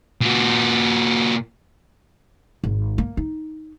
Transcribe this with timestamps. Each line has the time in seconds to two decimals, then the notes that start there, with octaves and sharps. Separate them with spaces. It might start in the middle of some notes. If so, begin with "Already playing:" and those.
0.21 A#2 F#4
2.64 G#1
2.98 A#3
3.17 D#4